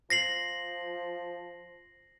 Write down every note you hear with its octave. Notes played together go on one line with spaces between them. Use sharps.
F3 A#6 C7 F#7